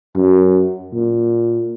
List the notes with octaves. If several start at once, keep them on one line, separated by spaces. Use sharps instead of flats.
F#2
A#2